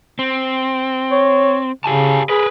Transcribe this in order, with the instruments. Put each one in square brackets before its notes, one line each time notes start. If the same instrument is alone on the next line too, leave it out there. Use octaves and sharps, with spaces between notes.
[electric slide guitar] C4
[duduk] C#5
[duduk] C#3 [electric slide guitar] G4 G#5 A5
[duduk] G#4 [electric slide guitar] A#4 B4